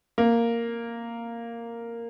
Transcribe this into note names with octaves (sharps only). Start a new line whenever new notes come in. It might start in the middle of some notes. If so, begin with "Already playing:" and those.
A#3